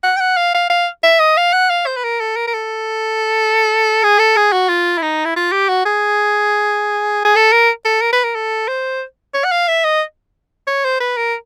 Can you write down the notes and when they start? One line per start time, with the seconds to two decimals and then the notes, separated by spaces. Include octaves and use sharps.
0.04 F#5
0.17 G5
0.20 F#5
0.37 F5
0.55 F5
0.70 F5
1.03 E5
1.20 D#5
1.37 F5
1.53 F#5
1.70 F5
1.86 C5
1.97 B4
2.04 A#4
2.20 A4
2.36 A#4
2.47 A#4
2.54 A4
4.03 G#4
4.19 A4
4.36 G#4
4.53 F#4
4.69 F4
4.98 E4
5.02 D#4
5.25 E4
5.36 F4
5.52 G4
5.69 F#4
5.86 G#4
7.25 G#4
7.36 A4
7.52 A#4
7.85 A4
8.01 A#4
8.13 B4
8.24 A#4
8.35 A4
8.68 C5
9.34 C#5
9.44 F#5
9.52 F5
9.68 E5
9.84 D#5
10.67 C#5
10.85 C5
11.00 B4
11.17 A#4